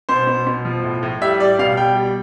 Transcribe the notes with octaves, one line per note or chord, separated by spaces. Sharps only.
B2 C5
B2
B2
F3
A2
A2
G3 E5
G3 D5
B2 F5
G3 G5
G3